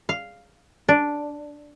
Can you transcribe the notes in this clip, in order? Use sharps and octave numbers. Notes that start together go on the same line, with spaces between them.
F5
D4